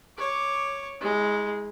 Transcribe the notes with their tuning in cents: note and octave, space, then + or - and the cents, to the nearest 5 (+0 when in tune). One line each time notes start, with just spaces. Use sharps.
C#5 +0 D6 +5
G#3 +0 E4 -40